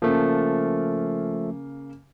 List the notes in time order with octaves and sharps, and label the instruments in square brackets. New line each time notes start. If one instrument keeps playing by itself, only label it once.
[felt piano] C#3 A#3 [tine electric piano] F3 A3